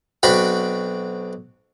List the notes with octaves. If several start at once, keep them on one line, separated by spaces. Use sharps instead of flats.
B1 C4 D4 F#4 B5